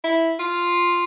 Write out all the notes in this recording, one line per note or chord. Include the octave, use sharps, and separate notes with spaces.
E4
F4